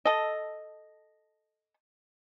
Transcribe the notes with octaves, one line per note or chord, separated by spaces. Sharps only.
A4 D#5